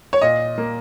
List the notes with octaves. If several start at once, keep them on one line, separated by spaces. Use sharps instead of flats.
C#5
A#2 D#5
A#3